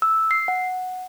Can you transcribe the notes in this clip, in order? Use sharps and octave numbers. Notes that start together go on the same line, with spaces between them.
E6
C7
F#5